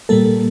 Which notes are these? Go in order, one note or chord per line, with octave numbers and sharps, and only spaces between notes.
A#2 G3 A#3 A4